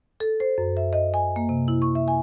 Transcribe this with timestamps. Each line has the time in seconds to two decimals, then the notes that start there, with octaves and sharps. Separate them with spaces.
0.20 A4
0.40 C5
0.58 F#2
0.77 E5
0.93 D#5
1.14 G#5
1.36 A#3
1.49 C3
1.68 E4
1.82 C#6
1.95 E5
2.08 G#5